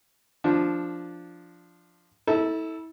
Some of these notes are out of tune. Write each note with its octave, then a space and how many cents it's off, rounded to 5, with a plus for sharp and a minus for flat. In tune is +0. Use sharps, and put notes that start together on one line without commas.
F3 +0 D4 +0
E4 -35 A4 +0